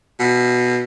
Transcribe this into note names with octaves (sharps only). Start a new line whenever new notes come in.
B2